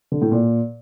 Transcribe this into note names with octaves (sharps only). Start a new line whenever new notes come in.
D3
A2
A#2